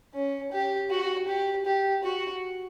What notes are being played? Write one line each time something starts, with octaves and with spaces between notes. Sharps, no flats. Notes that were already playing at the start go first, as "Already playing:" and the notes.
C#4
G4
F#4
G4
G4
F#4